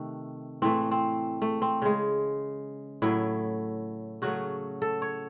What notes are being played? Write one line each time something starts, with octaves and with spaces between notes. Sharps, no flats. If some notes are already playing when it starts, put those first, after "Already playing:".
Already playing: C3 D#3 A3
A2 E3 A3 C4
C4
A3
C4
C#3 G#3
A2 F#3 A3 E4
C#3 F#3 A3 F#4
A4
C#5